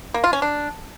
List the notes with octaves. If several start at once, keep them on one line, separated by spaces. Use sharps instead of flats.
A#3
F4
C#4
D4